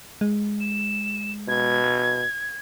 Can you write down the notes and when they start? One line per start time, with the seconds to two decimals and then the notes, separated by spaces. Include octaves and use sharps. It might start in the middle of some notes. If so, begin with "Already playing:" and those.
0.21 G#3
0.60 E7
1.48 B2 G#6